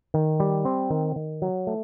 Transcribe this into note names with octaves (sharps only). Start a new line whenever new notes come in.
D#3
G3
C4
D#3
D#3
F#3
A3